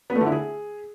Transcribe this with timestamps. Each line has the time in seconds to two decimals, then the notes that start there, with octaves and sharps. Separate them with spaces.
0.10 B3
0.15 A3
0.21 D3
0.26 E4
0.32 G#4